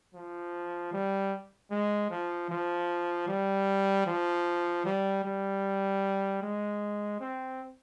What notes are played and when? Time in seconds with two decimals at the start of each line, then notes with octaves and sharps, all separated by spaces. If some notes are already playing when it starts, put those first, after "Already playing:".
0.14 F3
0.93 G3
1.71 G#3
2.10 F3
2.50 F3
3.28 G3
4.07 F3
4.85 G3
5.24 G3
6.42 G#3
7.20 C4